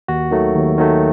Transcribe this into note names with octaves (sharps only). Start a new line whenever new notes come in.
D#2 F#4
D#3 F#3 A3
D#2
D#3 F#3 A3